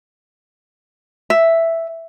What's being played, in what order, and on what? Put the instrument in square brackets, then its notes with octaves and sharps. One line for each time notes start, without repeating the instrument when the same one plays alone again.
[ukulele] E5